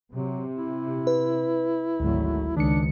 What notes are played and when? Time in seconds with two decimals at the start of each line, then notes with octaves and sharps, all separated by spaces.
0.12 C3 F#3
0.55 E4
1.07 B4
2.00 G#1 D2 F#3 A3
2.57 C#2 D#3 D4 C#7